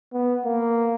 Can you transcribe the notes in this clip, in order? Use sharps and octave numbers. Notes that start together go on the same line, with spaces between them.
B3
A#3